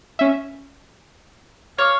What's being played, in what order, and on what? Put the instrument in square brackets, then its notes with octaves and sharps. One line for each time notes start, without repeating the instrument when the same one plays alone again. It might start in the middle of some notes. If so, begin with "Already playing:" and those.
[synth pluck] C#4 E5
[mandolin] C#5 [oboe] F5